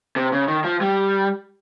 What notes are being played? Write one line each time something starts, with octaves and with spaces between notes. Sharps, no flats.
C3
C#3
D#3
F3
G3